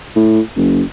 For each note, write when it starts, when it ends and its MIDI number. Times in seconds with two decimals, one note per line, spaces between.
0.16 0.40 45
0.57 0.82 30